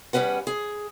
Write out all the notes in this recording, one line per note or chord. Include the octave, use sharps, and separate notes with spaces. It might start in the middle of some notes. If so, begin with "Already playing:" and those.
E2 G3 C#4 B4 F#5
G#4